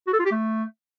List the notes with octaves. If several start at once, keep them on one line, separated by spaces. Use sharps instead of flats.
F#4
A4
F4
G4
A3